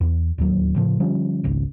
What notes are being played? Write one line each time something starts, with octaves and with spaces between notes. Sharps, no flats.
E2
D1 D#2 F#3
A2 C#3 F3
D3 F3 G3 C#4
G#1 C#2